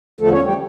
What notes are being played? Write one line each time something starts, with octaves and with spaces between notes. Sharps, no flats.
E2 D3 F3 A3 A4
C#4 C#5
G3 G4